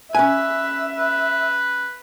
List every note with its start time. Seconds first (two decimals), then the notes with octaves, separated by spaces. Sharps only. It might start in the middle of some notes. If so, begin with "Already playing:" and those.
0.15 C#4 B4 E5 G#5
0.96 B4